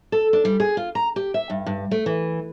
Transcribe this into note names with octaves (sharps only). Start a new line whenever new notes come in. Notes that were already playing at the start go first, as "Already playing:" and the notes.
A4
D4
G3
G#4
F4
A#5
G4
E5
G2
G2
A3
E3